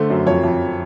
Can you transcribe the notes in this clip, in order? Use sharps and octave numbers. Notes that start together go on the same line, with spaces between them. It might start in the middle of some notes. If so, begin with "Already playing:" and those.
Already playing: D3 A3 C5
F#2
F2 C#5
F2